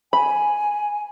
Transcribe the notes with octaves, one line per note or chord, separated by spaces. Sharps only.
G#5 B5